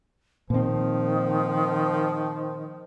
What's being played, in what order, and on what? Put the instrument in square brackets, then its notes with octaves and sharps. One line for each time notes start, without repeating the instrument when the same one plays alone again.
[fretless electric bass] A#2 C4 [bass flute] D#3 [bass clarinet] F3